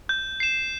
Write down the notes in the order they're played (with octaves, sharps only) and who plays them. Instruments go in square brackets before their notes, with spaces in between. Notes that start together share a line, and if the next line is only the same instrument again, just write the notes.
[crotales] G6
C7 E7